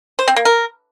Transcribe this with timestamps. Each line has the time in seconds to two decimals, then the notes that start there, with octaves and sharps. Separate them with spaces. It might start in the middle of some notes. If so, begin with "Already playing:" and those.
0.19 C5
0.28 C4
0.36 A#3
0.45 A#4